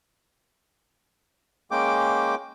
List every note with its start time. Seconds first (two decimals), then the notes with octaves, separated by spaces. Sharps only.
1.71 G#3 A#3 C#4 G5 D6